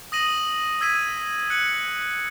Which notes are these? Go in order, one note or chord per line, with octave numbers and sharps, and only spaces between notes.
D#6 A#6 D#7 F#7
E6 G#6 B6 D#7
F#6 C#7 F#7